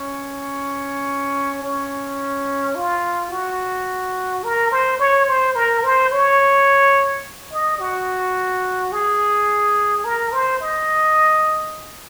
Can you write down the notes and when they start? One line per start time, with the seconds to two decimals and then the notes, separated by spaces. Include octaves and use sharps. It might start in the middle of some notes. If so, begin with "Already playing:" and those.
Already playing: C#4
1.62 C#4
2.75 F4
3.31 F#4
4.44 A#4
4.72 C5
5.00 C#5
5.27 C5
5.56 A#4
5.84 C5
6.12 C#5
7.51 D#5
7.80 F#4
8.92 G#4
10.04 A#4
10.33 C5
10.61 D#5